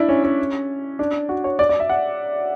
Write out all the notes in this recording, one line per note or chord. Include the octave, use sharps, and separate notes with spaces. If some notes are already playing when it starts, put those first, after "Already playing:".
Already playing: D4 E4
C#4
C#4
D4
F#4
C#5
D5
D5
E5
F#5